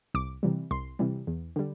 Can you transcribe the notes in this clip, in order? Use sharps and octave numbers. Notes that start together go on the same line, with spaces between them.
C2 D6
C3 E3 G3
C2 C6
C3 E3 G3
E2
D3 G3